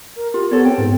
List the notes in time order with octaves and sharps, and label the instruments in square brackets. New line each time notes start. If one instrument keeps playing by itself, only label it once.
[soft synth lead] A#4
[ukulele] F4 [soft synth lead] G4
[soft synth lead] B3 [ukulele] A4 C#5
[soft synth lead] C4 [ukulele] G5
[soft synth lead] G#2